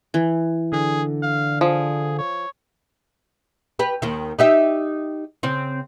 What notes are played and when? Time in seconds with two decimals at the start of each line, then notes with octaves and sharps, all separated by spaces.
0.14 E3
0.72 D3 G#4
1.23 F5
1.61 F3 G#4
2.19 C#5
3.79 G4 B4
4.02 D#2 D#3
4.39 D#4 G4 E5
5.43 C#3 C4